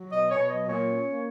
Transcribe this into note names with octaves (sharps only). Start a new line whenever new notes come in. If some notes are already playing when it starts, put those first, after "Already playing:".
Already playing: F#3
B2 D#5
B2 C#5
F#3 D#5
A#2 C#5
C#4
A#3